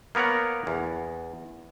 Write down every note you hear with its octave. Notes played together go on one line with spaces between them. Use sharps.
A#3 B3 A#4 C#5 F#5
E2